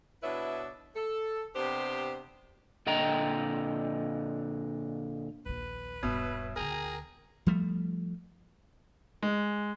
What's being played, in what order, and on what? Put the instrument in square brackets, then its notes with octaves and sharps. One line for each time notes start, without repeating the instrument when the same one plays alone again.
[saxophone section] B2 D4 E4 B4 C#5 E5
A4
C3 B3 D4 G4 C5
[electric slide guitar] A#2 D3 D#5 G5 A#5
[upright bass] A#1 D#2 [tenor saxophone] B4
[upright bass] D#1 G2 [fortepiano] B2 [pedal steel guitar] C#5 E5
[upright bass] D2 D3 [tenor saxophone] G#4 [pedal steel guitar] A#4 G5 A#5
[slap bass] F3 G3 A3
[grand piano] G#3